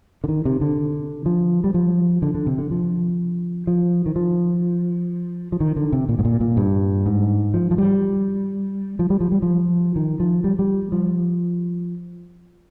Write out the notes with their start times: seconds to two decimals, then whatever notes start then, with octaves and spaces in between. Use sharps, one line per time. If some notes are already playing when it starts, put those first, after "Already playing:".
0.24 D3
0.28 D#3
0.45 C3
0.61 D3
1.26 F3
1.64 G3
1.74 F3
2.22 D3
2.35 D3
2.46 C3
2.58 D3
2.71 F3
3.67 F3
4.06 D#3
4.16 F3
5.52 F3
5.60 D#3
5.76 D3
5.92 C3
6.09 A#2
6.19 G#2
6.25 A#2
6.41 A#2
6.57 G2
7.06 G#2
7.54 F3
7.71 F3
7.78 G3
8.99 F3
9.10 G3
9.21 F3
9.32 G3
9.42 F3
9.96 D#3
10.20 F3
10.44 G3
10.59 G3
10.92 F3